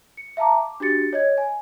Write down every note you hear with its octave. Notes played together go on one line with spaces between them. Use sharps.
C#7
E5 F5 A5 A#5 D6
D6
D4 F#4 G4 A6 C#7
C#5 D#5 G#6
G#5